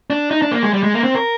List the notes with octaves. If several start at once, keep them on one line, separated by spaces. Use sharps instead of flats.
D4
D#4
D4
A#3
G#3
G3
G#3
A#3
C4
A#4